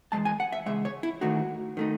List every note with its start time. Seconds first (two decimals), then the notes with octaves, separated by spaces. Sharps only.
0.12 E2 C#3 G#3 A5
0.25 G#5
0.40 F#5
0.52 E5
0.66 E2 C#3 G#3 E5
0.85 C#5
1.03 E4
1.21 D#2 D#3 A3 D#4 F#4
1.77 D#3 A3 D#4